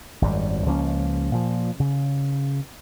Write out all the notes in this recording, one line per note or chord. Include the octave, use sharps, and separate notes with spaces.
G#1 F#2 G3
C#2 F3 A#3 C#4
A#2 F3
C#3